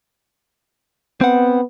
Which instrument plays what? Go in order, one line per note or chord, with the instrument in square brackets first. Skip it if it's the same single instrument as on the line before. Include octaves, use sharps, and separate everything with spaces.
[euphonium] B3 [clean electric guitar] C4 F#5